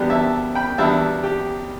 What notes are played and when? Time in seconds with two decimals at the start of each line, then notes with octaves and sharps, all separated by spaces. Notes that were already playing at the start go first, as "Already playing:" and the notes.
Already playing: E2 B2 G3 B3 D4 G4
0.10 E5 A5
0.55 G5 B5
0.78 E2 B2 G3 B3 D4 E5 A5
1.23 G4